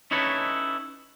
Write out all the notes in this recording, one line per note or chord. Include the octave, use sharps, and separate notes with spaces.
C#4 D#4 E4 A4 B4 C#5